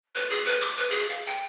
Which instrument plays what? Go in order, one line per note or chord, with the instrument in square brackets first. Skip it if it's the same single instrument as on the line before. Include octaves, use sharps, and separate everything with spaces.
[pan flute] B4
G#4
B4
D6
B4
G#4
F5
G5